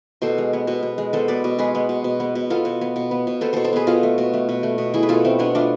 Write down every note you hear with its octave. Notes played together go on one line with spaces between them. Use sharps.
B2 A4 C5
G#3
B3
B2
B2
G#3
B3 A4 C5
B2 B4 D5
B2
G#3 G#4 B4
B3
B2
B2
B3
B2
B3 F4 A4
B2
B3
B2
B3
B2
B3 A4 C5
B2 A4 C5
A4 C5
B3 G#4 B4
B2 F4 A4
A3
B2
A3
B2
A3
B2
A3 E4 G#4
B4
B2 F4 A4
A3 C4
B2 B3 D4
A3 D4 F4